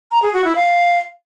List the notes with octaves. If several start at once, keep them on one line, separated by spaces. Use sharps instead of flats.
A#5
G#4
F#4
E4
F5